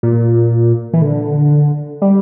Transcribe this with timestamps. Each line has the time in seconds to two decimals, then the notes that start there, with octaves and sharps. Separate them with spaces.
0.03 A#2
0.94 E3
1.02 D3
2.02 G3